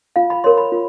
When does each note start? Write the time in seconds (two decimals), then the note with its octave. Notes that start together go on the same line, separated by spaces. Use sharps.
0.16 F4 F5
0.30 B5
0.44 A#4 C#5 C6
0.57 B5
0.72 F4